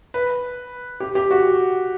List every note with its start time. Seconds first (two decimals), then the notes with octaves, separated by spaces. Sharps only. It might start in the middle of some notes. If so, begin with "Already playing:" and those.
0.14 B4
1.00 G4
1.15 G4
1.31 F#4